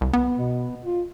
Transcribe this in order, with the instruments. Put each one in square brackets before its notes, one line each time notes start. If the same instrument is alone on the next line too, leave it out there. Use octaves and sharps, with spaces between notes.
[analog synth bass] C2
B3
[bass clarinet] B2
F4